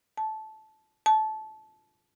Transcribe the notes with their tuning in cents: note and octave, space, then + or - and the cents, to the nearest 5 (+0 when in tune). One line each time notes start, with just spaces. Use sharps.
A5 -15
A5 -20